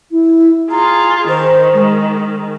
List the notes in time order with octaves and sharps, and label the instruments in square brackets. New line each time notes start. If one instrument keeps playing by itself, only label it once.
[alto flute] E4
[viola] F4 G#4 [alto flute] A#5
[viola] D#3 [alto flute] C5
[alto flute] G#3